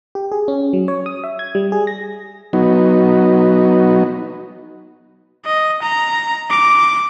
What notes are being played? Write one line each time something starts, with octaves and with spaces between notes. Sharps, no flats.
G4
G#4
C#4
F#3
C#5
D#6
E5
G#6
G3
G#4
A#6
F#3 B3 D#4
D#5
A#5
D6